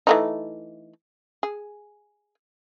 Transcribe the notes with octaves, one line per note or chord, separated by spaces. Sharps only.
E3 A3 D#4
G#4